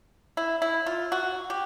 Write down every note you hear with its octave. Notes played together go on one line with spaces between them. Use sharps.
E4
E4
F4
F#4
G4